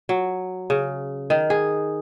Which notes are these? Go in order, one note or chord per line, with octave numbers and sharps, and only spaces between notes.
F#3
C#3
D#3
G#4